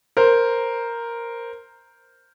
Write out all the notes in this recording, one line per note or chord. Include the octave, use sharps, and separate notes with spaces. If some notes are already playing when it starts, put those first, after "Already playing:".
A#4 C5